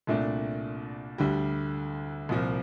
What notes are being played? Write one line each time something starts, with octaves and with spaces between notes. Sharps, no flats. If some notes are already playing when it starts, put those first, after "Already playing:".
C2 A#2 A3 D4
D2 D3 G3
C2 A#2 F3